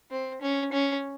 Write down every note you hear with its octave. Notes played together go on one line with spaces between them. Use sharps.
C4
C#4
C#4